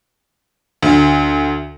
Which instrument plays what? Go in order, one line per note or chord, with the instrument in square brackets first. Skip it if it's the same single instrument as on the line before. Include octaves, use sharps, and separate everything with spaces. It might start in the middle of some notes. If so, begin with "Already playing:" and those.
[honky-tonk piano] D2